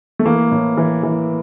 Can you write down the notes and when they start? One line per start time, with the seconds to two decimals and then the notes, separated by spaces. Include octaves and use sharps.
0.19 A3
0.26 E3 A#3
0.51 A2
0.77 E3
1.03 E3